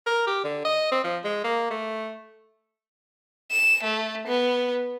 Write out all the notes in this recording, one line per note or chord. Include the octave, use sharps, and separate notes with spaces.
A#4
G4
D3
D#5
C4
F3
G#3
A#3
A3
E7
A3
B3